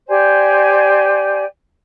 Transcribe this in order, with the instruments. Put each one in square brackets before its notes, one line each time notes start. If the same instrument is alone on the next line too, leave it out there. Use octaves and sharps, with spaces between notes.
[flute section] G4 C5 D5 G#5